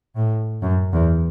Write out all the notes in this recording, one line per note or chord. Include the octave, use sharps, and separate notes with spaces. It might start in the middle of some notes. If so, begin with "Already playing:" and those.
A2
F#2
E2